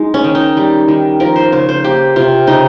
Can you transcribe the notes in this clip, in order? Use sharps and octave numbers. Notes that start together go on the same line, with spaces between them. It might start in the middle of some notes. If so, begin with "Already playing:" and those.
Already playing: G#3 D#4
C#4
D#3
D#4
G3
D#3
F3 A#4
C5
C#3 C5
C5
A#3 G4
C3 F4
C#3 D#4